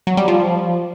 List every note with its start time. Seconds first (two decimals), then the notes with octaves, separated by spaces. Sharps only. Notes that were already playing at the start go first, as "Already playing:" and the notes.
0.07 F#3
0.17 G3
0.28 F3